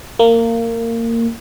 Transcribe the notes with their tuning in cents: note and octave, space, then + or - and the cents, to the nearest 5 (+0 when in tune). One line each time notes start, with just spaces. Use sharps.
A#3 -20